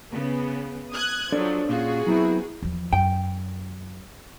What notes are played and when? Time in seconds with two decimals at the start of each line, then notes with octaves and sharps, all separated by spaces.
0.11 C#3 B3
0.92 D#6 F#6 G#6
1.32 F3 F#3 D4 A4 D5
1.69 A#2 C#4 F4 F#4 G#4
2.06 F#3 B3 C4 E4
2.62 E2 F3
2.93 F#2 G5